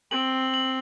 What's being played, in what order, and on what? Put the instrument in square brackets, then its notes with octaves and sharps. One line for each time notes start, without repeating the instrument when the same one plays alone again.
[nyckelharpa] C4 [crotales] F#7
[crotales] F#7